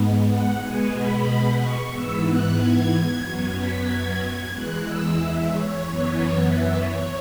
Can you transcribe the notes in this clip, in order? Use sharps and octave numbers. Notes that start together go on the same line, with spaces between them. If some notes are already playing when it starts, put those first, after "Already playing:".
Already playing: G#2 G#3 B3
F#5
B2 G#3 B3 G#5
B5
C#6
G#2 E3 B3 E6
F#6
G#6
F#2 F#3 B3
B6
G#6
G#6
E2 E3 G#3 F#6
E6
E5
C#5
F#2 E3 B3
E5
C#5